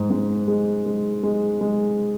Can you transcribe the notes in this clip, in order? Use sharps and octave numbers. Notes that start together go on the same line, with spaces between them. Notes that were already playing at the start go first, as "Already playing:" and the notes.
Already playing: G#2
G#2
G#3
G#3
G#3
G#3